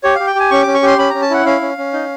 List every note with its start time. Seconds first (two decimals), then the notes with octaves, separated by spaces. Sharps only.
0.04 G4 C#5
0.15 G4 F5
0.27 G5
0.35 G4 G#5
0.51 C#4 C#6
0.63 C#4 D6
0.74 C#6
0.83 G4 C6
0.98 C#4 B5
1.10 C#4 A#5
1.22 A5
1.30 E4 F#5
1.46 C#4 F5
1.61 C#4
1.78 C#4
1.93 D#4